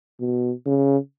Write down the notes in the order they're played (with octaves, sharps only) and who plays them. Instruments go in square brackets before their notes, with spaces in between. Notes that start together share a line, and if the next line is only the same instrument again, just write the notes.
[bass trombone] B2
C#3